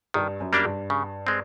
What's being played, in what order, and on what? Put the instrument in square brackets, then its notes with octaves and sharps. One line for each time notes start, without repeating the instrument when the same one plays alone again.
[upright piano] G2 [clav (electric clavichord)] D#3
[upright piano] F#2
[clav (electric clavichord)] G3 A#3 D4 G4
[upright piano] G2
[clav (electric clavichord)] C#3
G#3 C4